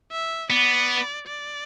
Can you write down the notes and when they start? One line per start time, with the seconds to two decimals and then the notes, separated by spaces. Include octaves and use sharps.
0.12 E5
0.51 B3 D5
1.27 D5